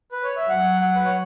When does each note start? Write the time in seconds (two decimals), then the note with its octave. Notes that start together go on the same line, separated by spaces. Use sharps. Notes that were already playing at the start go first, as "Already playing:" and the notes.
0.12 B4
0.23 C#5
0.36 E5
0.48 F#3 F#5
0.81 F#5
0.96 B4
1.05 C#5